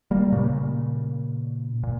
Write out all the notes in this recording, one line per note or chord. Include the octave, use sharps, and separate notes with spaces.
G3 A#3
A#2 C#3
A#2